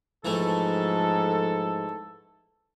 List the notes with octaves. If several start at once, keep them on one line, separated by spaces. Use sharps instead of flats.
G#2 E3 F3 A3 A4